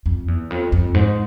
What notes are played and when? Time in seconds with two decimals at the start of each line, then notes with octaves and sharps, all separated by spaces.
0.06 F2
0.28 E2
0.50 F2
0.72 F2
0.94 G#2